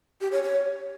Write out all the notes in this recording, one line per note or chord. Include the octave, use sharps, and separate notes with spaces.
G4
C#5
C#5